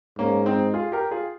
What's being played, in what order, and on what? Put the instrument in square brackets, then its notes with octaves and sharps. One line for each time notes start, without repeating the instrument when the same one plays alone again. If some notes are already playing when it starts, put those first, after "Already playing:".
[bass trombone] G#2 [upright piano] A#3 C#4
[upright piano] C4 D#4
F4 G#4
G4 A#4
F4 G#4